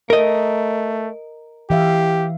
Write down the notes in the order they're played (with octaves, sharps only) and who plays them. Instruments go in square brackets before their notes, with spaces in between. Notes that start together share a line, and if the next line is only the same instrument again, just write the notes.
[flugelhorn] A3 [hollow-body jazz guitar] A#4 D#5
[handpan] E3 E5 F5 [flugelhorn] G4